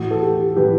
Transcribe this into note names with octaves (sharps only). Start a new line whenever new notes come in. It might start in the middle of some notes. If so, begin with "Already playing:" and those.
Already playing: A2 E3 F#4
A4
G4
A2 E3 G4 B4